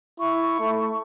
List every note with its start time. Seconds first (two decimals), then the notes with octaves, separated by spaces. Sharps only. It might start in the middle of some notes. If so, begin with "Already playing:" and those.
0.20 E4 C#6
0.59 A3